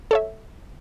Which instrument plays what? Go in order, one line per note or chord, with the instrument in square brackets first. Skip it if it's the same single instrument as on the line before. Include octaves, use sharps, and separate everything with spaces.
[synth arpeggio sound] A4 C#5 E5